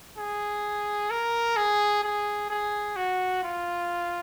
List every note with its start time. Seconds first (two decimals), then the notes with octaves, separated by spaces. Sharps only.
0.18 G#4
1.11 A#4
1.57 G#4
2.03 G#4
2.50 G#4
2.96 F#4
3.43 F4